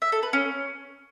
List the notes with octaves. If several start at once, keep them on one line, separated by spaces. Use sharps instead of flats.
E5
A4
B4
C#4